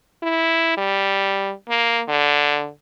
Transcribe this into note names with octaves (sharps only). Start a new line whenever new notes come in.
E4
G3
A#3
D3